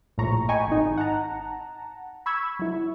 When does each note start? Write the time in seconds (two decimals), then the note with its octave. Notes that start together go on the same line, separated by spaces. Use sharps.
0.18 A#1 A2 A#5 C#6
0.49 D#5 G5 G#5 A#5 B5 C#6
0.68 G#1 D#4
0.98 F#5 A5 A#5
2.26 B5 C#6 E6 G#6
2.59 F#3 E4